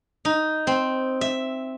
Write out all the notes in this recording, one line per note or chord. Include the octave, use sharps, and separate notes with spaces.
D#4
C4
E5